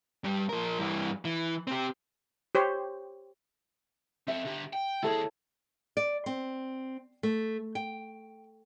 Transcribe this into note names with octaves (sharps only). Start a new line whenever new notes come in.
G2 G3
F3 A#4
G2 E3
E3
C4 G4
G4 C5 C#5
C4 A4 E5
D3 G4
G5
D#2 E4 G#4 A4 C#5
D5
C4
A3
G5